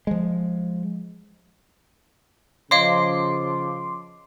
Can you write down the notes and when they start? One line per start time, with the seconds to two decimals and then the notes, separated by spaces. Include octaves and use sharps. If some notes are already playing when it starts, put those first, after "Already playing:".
0.07 F3 G#3
2.71 C#3 F3 C#5 D#5 F5 C6 D6